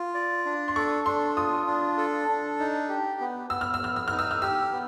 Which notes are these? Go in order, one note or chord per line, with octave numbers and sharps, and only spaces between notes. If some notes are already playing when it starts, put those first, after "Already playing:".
Already playing: F4
D5
D4
C6
A4 C#6
D4 C6
F4 D#6
D4
A4
D4
D#4
G4
B3
B3 E6
F6
E6
B3 F6
E6
D#4 F6
E6
F6
G4 E6
B3